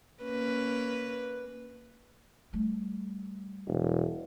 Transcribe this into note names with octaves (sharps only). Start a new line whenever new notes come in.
A#3 C#4 B4
G3 A3
E1